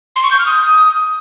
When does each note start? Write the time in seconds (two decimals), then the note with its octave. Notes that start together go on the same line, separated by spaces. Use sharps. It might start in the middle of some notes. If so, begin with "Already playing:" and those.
0.16 C6
0.23 C#6
0.31 G6
0.39 F6
0.46 D#6